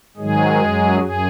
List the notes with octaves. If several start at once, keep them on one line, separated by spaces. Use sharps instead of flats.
G#2 D#3 F#3 G#3 G#4
F#2 F#3
F#2 G#4